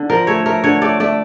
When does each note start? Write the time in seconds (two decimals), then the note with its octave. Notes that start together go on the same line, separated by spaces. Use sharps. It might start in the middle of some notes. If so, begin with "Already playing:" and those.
Already playing: D3
0.10 F3 A#4
0.27 A3 C#5
0.46 A3 A#4
0.64 D3 C#5
0.82 A3 D5
1.00 A3 D5